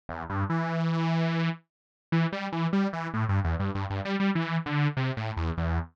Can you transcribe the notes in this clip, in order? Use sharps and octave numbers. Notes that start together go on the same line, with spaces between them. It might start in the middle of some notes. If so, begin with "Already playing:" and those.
E2
G2
E3
E3
G3
E3
G3
E3
A2
G2
E2
G2
G2
G2
G3
G3
E3
D3
C3
A2
E2
E2